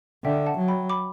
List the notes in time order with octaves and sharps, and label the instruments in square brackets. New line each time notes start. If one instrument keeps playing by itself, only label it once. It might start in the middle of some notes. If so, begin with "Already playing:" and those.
[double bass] D3 [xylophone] E5 G5
[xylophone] F#5 A5
[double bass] F#3
[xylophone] G5 B5
B5 D6